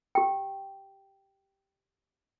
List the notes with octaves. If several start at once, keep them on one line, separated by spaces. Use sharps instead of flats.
G4 G5